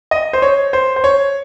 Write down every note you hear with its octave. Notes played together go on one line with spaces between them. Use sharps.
D#5
C5
C#5
C5
C5
C#5